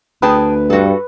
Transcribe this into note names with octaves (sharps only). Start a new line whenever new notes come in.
D2 G#4 B4 G5 A5
G2 F#4 A4